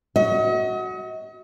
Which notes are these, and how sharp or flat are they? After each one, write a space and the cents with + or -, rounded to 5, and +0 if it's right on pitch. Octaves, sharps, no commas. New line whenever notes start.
F#4 +0 D#5 +40